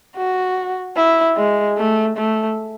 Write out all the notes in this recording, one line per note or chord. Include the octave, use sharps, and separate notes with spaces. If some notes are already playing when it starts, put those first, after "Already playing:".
F#4
E4
G#3
A3
A3